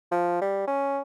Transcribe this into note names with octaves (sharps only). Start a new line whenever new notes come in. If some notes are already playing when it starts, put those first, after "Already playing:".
F3
G3
C#4